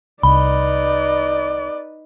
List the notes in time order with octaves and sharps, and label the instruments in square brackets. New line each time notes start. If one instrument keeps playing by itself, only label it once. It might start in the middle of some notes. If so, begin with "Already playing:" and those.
[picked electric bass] C2 [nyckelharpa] D#4 B4 [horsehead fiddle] D5 [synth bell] B5